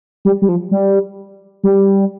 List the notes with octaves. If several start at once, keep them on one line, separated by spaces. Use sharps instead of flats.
G3
G3
F3
G3
G3